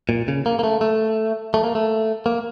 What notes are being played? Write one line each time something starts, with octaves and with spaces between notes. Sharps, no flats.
A#2
C#3
A#3
A#3
A3
A3
A3
A#3
A3
A#3